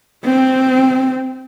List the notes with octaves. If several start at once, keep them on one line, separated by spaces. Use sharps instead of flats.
C4